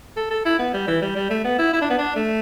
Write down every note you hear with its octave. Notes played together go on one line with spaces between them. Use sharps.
A4
A4
E4
B3
G3
E3
G3
G3
A3
B3
E4
E4
D4
B3
D4
A3